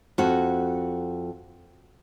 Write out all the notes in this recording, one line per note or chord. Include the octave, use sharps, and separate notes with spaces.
F2 F#4